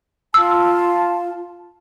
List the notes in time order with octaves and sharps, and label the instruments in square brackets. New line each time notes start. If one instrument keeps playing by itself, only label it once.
[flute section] F4 A5 [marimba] E6